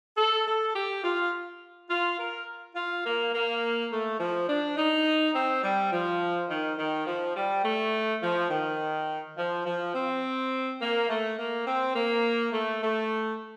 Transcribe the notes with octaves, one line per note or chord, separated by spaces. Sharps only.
A4
A4
G4
F4
F4
A#4
F4
A#3
A#3
A3
F3
D4
D#4
C4
G3
F3
D#3
D#3
F3
G3
A3
F3
D#3
F3
F3
C4
A#3
A3
A#3
C4
A#3
A3
A3